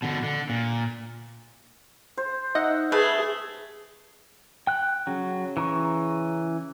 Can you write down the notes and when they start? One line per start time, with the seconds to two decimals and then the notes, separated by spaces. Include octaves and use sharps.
0.02 B2 D3
0.23 D3
0.49 A#2
2.17 C5
2.55 D#4 D#5 E5 F#5
2.92 A3 G#4 B4
4.67 G5 F#6
5.07 C#3 F#3
5.57 E3 A#5 C#6